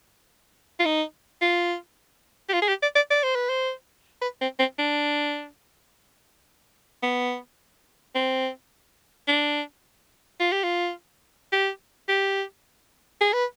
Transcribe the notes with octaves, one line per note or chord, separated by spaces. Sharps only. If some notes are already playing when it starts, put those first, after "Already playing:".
F4
D#4
F4
G4
F4
G#4
G4
D5
D5
D5
C5
B4
C5
B4
C4
C4
D4
B3
C4
D4
F4
G4
F4
G4
G4
G#4
B4